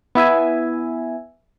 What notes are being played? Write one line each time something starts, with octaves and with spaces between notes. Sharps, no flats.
B3 E4 E5 G#5